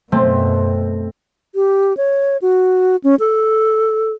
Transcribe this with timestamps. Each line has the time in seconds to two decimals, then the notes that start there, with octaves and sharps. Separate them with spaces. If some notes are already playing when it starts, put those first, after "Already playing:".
0.12 F#2 B2 A3 C4
1.55 G4
1.97 C#5
2.42 F#4
3.04 C#4
3.20 A4